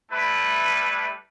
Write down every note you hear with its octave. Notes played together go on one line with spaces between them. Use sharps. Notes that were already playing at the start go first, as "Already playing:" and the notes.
G3 A3 E4 B4